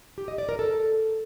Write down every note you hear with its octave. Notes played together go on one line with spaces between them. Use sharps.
G4
D#5
D5
A#4
A4